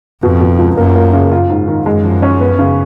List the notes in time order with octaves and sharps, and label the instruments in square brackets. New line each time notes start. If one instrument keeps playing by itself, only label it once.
[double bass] F2 [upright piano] B2
[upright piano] B2
C#2
[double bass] F#2 [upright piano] A#3
[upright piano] A#3
C#3
F4
G#2
D#3
[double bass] F#2 [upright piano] G#3
[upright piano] F3
C#4
B3
C#3